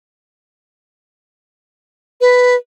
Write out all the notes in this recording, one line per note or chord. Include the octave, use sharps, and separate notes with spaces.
B4